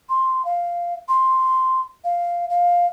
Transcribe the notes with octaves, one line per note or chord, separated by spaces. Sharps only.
C6
F5
C6
F5
F5